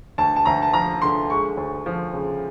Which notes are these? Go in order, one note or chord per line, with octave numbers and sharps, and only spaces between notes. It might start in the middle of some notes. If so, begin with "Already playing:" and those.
D2 A5
A5
D2 A#5
A5
F3 A#5
D3 C6
G#3 C#6
D2
F3
C#3